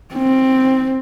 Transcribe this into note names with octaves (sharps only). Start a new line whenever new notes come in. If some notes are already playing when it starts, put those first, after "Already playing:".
C4